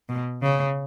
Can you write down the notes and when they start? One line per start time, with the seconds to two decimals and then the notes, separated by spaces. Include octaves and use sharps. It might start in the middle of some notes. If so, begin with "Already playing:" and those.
0.09 B2
0.43 C#3